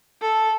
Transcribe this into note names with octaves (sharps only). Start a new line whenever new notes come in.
A4